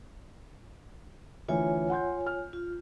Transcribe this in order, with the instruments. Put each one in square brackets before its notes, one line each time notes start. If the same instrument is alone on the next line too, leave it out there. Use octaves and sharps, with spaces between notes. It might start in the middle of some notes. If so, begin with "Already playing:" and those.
[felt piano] D2 D3 E3 [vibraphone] F4 C#5 G#5
[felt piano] F#5 C6 G6
F6
[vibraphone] F4